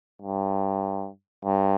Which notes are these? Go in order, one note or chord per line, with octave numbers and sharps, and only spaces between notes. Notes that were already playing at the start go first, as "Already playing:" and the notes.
G2
G2